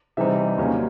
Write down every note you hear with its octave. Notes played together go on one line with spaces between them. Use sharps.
C3 E3 G3 C4 D#4 E5
D#2 D#3 F#3 A#3 C#4